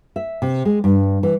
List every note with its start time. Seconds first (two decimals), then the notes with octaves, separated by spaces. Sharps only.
0.16 E5
0.42 C3
0.65 G#3
0.84 G2
1.23 E3